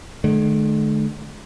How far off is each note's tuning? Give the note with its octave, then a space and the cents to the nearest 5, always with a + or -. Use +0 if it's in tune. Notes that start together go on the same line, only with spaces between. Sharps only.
D3 +40 A3 -45